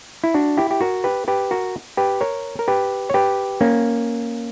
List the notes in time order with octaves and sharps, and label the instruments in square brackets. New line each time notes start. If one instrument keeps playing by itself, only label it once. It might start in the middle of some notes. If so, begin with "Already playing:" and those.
[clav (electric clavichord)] E4
D4 F#4
E4 G4
G4
F#4 A#4
G4 B4
G4 B4
F#4 A#4
G4 B4
A#4 C#5
A#4
G4 B4
C#5
G4 B4
A#3 C#4